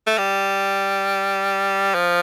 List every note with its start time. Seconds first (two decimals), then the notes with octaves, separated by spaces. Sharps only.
0.07 A3
0.18 G3
1.95 F3